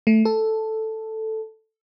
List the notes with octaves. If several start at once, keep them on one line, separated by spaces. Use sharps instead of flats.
A3
A4